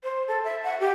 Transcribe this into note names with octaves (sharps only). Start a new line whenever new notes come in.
C5
A4
E5
F#5
G4